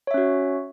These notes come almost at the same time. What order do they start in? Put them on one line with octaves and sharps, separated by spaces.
C#5 E5 C#4 F#4